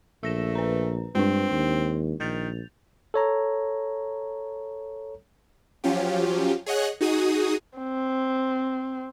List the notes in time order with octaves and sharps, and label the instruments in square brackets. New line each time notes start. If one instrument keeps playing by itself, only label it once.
[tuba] A#1 [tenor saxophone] A3 [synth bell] E6 A#6 E7
[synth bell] B4 A#5
[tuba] G2 [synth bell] G#3 D4 [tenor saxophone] C4
[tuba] D#2
[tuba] A#1 [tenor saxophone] D#3 [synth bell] G6 A6 F7
[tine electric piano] A4 C#5 A#5
[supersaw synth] F3 F#3 C#4 F4 G4
G#4 C#5 D#5 F#5 F#6
D#4 F#4 G#4 D#6
[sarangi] C4